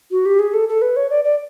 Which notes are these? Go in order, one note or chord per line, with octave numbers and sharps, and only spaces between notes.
F#4
G4
G#4
A4
A4
B4
C#5
D5
D5